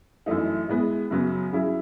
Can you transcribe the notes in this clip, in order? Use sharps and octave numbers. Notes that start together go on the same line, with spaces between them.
F#2 E3 A3 D#4
A2 G#3 B3
F#2 C#3 F#3 B3
F#3 C#4 E4 G#4